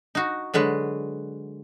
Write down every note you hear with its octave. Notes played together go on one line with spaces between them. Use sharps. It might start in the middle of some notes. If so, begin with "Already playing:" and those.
D#4 F#4
D3 F#3 G#3 B4